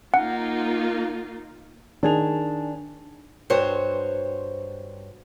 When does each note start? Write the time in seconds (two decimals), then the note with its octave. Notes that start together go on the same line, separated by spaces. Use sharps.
0.14 A#3 D#4 F4 F#5
2.03 D#3 D4 G#4 G#5 F7
3.50 G2 F#4 C5 C#5